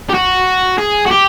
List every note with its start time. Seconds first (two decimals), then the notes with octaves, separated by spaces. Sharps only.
0.10 G4
0.14 F#4
0.78 G#4
1.06 F#4
1.11 G4